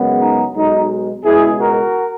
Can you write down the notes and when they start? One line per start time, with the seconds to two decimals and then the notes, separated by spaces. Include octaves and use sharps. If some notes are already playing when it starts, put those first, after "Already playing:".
Already playing: F#2 C#3 G#3 B3
0.20 D#4
0.54 B1 B2 G#3 D#4
1.23 C#2 B2 G#3 E4 G#4
1.58 F#4 A#4